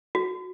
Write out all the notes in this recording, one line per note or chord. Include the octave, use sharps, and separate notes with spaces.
F#4